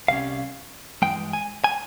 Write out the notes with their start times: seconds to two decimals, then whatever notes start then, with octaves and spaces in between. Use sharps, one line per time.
0.08 C2 C3 G3 C#4 F5
1.02 G2 E3 G#3 G5
1.33 G#5
1.64 G#5